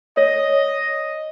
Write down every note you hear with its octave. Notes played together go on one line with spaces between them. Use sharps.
C#5 D#5